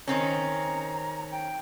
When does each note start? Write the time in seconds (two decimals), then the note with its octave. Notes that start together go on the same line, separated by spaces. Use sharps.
0.08 D#3 C4 C#4 A#5
1.32 G5